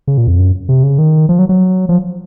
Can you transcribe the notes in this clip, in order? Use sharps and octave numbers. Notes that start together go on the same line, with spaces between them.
C#3
A#2
F2
F#2
C3
C#3
D#3
F3
F#3
F#3
F3